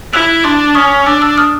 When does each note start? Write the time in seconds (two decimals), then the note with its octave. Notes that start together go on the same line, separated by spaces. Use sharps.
0.13 E4 E6 F#6
0.44 D4 C6 D6
0.75 C#4 C#6 D#6
1.06 D4 D6 E6
1.22 D6 E6
1.37 D#6 F6